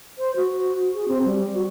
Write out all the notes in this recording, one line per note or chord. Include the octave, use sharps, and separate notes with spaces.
C5
F#4
G#4
C4
G3
F#4